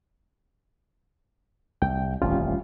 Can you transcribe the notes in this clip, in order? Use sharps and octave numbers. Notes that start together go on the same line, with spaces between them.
C2 G5
D#1 A1 F2 G3 C#4 F4